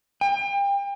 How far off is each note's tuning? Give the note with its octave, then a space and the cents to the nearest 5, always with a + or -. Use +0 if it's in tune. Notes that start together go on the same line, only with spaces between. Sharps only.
G5 +35